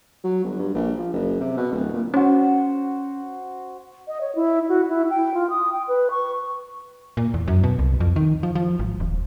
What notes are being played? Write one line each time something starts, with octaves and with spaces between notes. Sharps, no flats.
F#3
G1
G2
A#1
F3
F#1
C3
B2
D1
A#2
C#4 F#4 C5
D#5
C#5
E4
F#4
E4
G5
F4
D#6
G5
B4
C#6
A#2
E2
F#2
B2
C2
F2
D#3
F3
F3
G#1
D#1